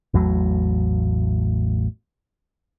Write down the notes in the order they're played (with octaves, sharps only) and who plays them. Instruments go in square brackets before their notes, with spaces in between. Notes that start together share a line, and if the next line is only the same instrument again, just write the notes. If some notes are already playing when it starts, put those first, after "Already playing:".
[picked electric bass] A1 E2 A2 F#3